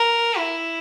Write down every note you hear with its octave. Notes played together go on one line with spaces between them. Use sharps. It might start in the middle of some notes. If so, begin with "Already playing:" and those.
Already playing: A#4
E4